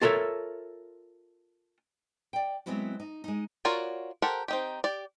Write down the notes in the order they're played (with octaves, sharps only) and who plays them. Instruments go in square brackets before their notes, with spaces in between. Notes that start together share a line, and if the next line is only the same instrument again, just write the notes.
[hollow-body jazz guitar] F4 A4 A#4 C#5 E5
[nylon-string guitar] D5 G5
F#3 G#3 B3 C4 E4 F#4
D#4
G#3 D#4
[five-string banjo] F4 F#4 A#4 C#5 D5
G4 A4 A#4 C5 F#5
C4 D#4 G4
G4 D5